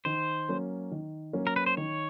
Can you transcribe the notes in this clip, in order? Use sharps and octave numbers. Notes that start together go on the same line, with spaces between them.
D#3 C5
F#3 A#3 C#4
D#3
F#3 A#3 C#4
A#4
B4
C5
D#3 C#5